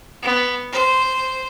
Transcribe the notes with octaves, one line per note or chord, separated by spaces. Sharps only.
B3
C5